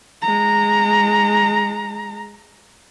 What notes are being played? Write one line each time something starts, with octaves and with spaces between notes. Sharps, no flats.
G#3 A#5